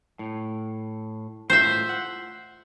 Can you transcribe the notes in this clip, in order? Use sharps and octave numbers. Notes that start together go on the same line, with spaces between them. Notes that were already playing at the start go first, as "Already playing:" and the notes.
A2
A2 F4 C5 E5
F#5